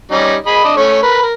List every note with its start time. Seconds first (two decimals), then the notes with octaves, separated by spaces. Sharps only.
0.12 G3 C#4 D#4
0.46 G#4 D#5 B5
0.64 D4 D#5
0.77 A3 C#4 C#5
1.03 A#4 B4
1.22 A#4